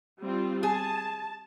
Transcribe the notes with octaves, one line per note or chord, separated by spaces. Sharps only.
G3 C4 F4
G#4 A5